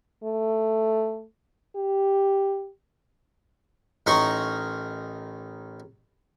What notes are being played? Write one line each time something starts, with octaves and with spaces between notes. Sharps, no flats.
A3
G4
A1 D#4 A#4 C6 C#6